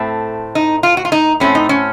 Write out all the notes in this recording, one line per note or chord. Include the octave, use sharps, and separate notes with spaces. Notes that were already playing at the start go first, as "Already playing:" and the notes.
Already playing: A2 A3 C4
D#4
F4
F#4
F4
D#4
A2 A3 C4 C#4
D#4
C#4